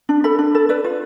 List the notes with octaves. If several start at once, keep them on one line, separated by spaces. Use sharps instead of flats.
D4
A4 B5
D4
A4
B4 D5
F4